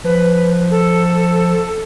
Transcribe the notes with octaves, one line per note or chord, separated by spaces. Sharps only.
F3 B4
A4